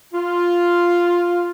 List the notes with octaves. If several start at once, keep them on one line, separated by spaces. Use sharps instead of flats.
F4